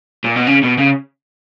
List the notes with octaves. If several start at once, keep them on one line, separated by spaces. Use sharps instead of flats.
A#2
B2
C#3
B2
C#3